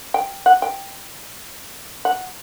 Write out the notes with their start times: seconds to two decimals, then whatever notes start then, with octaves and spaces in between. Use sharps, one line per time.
0.14 G5
0.46 F#5
0.62 G5
2.05 F#5